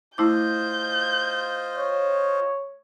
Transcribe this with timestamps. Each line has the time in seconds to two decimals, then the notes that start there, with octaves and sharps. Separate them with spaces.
0.18 A3 E4 F4 C5 D#5 D6 G6
1.77 C#5